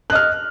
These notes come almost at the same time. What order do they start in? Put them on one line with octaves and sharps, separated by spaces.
F#6 D#5 F6